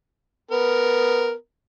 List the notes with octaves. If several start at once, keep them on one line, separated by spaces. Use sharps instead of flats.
B3 A#4